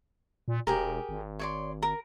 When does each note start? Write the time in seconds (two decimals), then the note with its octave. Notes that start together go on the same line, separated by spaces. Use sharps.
0.48 A#2
0.67 E1 G4 G#4 A#4
1.09 G#1
1.39 C#5 D5 C6
1.82 A#4